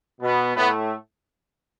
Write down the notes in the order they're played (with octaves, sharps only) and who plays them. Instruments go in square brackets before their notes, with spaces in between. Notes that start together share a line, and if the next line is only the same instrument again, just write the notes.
[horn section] B2 B3
A2 A3 B3